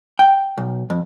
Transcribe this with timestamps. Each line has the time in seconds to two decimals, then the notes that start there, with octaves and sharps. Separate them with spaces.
0.19 G5
0.58 B1
0.90 F2